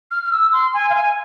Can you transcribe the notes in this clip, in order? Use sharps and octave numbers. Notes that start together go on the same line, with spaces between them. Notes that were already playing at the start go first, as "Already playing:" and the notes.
F6
F6
E6
C6
G#5
F5
G#5